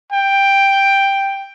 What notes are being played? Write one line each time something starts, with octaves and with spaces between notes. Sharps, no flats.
G5